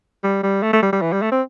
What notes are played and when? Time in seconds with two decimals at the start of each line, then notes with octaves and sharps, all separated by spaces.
0.24 G3
0.43 G3
0.63 A3
0.73 A3
0.82 G3
0.93 G3
1.02 E3
1.12 G3
1.22 A3
1.32 C4